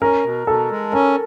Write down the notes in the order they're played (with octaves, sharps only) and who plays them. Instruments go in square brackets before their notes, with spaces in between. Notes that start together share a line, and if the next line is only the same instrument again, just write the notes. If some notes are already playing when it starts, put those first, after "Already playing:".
[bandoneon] C#4 [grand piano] A#4
[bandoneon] B2
[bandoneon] B2 [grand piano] A4
[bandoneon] G#3
[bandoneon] C#4 [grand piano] A#4